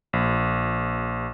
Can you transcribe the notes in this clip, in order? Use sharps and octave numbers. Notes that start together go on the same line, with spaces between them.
A#1